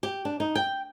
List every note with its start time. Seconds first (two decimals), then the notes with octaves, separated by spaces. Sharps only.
0.03 G4
0.25 D4
0.40 D#4
0.55 G5